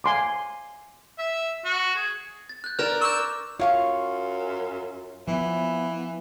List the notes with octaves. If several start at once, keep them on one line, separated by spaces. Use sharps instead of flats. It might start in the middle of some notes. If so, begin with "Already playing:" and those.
G#5 C6 D6
E5
F#4
G#4
A6
F#6 G6
D4 A#4 F6 F7
C#6 D6 E6 G6
F#2 F4 C#5 F5 C#6
E3 F3 B3